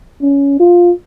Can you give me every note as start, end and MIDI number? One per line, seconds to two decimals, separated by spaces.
0.22 0.57 61
0.60 0.92 65